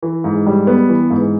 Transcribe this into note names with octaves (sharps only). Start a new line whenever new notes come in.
E3
G#2
G3
B3
E3
G#2